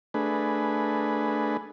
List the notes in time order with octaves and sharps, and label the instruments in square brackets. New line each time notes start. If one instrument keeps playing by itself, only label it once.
[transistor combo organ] A3 D4 G#4 B4